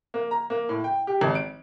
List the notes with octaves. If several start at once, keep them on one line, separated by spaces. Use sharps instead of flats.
A#3
A#5
A#3
A2
G5
G4
G#1
D7